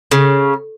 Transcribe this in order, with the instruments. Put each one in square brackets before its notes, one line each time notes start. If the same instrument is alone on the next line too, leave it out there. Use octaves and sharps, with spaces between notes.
[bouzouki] C#3